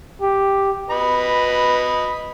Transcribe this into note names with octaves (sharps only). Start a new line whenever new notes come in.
G4
B4 D#5 B5